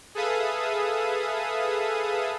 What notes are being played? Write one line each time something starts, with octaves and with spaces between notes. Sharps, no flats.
G#4 A4 B4 E5 F5 D#6